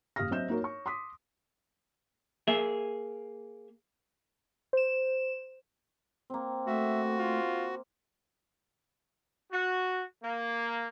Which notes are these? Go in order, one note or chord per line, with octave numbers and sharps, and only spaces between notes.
F#1 G4 F5 D#6 F6 A#6
F#3 C4 D#5 E5 G6 E7
A#3 D#4 F#4 A#4 C#5
C#5 C#6
C6 D6 D#6 B6
A#3 G#4 E5
C5 E7
A#3 C4
A3 F#4 E5
F4
F#4
A#3